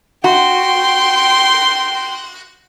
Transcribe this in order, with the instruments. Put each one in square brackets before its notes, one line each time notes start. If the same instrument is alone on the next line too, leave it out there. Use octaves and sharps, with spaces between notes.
[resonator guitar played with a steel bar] F#4 [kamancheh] G5 C6